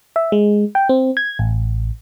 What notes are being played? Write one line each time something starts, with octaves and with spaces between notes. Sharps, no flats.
E5
G#3
G5
C4
G#6
A1